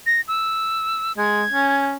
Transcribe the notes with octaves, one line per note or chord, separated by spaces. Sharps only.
A#6
E6
G#3 G#6
C#4